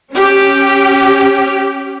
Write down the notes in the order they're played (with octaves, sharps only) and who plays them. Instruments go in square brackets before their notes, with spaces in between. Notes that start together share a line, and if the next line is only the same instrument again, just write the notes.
[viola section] C#4 G4